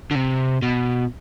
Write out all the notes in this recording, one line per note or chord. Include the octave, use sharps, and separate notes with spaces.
D3
C3
B2